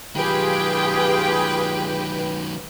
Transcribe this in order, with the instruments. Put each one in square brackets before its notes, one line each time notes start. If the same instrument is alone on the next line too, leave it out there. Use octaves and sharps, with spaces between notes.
[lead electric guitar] D#3 F#3 [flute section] F4 G4 G#4 [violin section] B4 G5